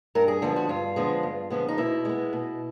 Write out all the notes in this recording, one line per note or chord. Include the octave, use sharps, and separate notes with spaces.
G2 A#4
G#4
D3 F3 G#3 B3
F#4
G2 F4
D3 F3 G#3 B3
G2
D3 F3 G#3 B3
D#4
B2 E4
G#3 B3
B2